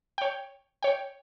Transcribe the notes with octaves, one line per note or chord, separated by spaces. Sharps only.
C#5 G5
C#5 G5